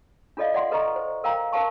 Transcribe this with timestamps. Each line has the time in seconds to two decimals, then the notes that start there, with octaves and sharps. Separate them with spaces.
0.37 D4 F4 A4 D5 D#5 F5
0.54 D5 E5 F#5 C6
0.71 A4 B4 D#5 A#5 C#6
0.96 C5
1.24 A#4 F5 G5 A#5
1.52 A#4 B4 F5 A5 C#6